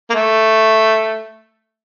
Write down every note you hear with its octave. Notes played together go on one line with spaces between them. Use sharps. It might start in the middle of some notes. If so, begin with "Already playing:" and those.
A#3
A3